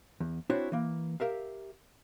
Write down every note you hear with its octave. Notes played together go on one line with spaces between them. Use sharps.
E2
C4 D4 E4 F#4 C5 C#5
E3 A#3
G4 A#4 E5 F5